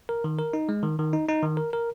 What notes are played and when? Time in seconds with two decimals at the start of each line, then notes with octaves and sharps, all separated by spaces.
0.09 A#4
0.24 D#3
0.39 A#4
0.53 D#4
0.69 G#3
0.83 D#3
0.99 D#3
1.13 D#4
1.29 D#4
1.42 D#3
1.57 A#4
1.73 A#4